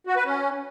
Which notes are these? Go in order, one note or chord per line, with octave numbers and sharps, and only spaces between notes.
F#4
B4
C#4